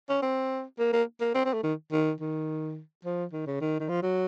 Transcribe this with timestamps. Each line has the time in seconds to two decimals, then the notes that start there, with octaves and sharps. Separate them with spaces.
0.09 C#4
0.22 C4
0.80 A#3
0.93 A#3
1.21 A#3
1.35 C4
1.45 C4
1.54 A3
1.63 D#3
1.92 D#3
2.21 D#3
3.05 F3
3.33 D#3
3.47 C#3
3.61 D#3
3.80 D#3
3.89 F3
4.03 F#3